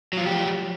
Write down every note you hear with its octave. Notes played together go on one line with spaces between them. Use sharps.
F3 F#3 F4 G4